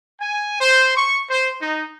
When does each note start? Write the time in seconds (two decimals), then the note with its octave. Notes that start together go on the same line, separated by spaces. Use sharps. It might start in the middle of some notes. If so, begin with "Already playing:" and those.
0.21 G#5
0.61 C5
0.97 C#6
1.30 C5
1.61 D#4